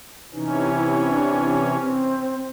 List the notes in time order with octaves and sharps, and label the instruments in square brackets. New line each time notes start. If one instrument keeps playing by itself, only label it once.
[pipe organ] C3 E3 C#4 [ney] D#4
[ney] E4
D4
C4